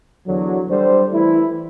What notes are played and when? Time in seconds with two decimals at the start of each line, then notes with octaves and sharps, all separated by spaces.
0.27 E2 D3 F#3
0.70 G3 D4 A4 C5
1.12 E3 A3 E4